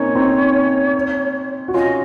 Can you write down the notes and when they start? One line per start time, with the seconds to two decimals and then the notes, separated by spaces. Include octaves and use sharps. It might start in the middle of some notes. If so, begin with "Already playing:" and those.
Already playing: A#3 C4 C#4 D#4 C#5
0.15 C4 D#4
1.68 F#4
1.74 C#4 F4 D#5